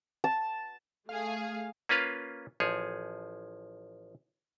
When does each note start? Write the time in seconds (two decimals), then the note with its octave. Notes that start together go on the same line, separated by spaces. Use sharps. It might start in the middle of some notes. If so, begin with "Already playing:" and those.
0.24 A5
1.09 A3 G#4 F5
1.89 A#3 C#4 F4 B4 F5
2.60 A1 F3 G#4 C#5